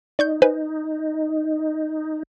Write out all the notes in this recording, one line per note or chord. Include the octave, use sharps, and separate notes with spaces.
D#4 D5 C#6 G6
D#4 B4 C5 G#5